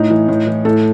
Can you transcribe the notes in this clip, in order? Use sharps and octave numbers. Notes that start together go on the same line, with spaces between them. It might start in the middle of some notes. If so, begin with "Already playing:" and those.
Already playing: A2 D#4
E3
A2
E3
A2 A4